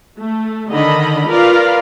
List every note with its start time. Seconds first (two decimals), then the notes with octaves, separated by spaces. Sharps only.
0.16 A3
0.70 D3 D#3 D#5 B5
1.28 F4 A#4 B4 D5 F5